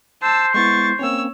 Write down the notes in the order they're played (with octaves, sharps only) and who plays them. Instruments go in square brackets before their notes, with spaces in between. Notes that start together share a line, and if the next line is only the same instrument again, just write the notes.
[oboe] C5 [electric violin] A5 E6
[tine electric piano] G#3 B3 E4 [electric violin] C#6 A6
[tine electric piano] A#3 C4 C#4 [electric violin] C#5 E6